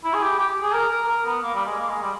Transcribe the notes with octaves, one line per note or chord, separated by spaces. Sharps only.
E4
G#4
G4
G4
G#4
A#4
A#4
A#4
B3
A#3
G3
G#3
A#3
G#3
G3